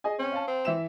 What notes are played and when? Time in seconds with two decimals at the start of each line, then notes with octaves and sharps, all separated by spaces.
0.04 G#4 D#5 G#5
0.19 C4 C#4
0.32 F5 A5
0.48 C4
0.65 E3 E5 E7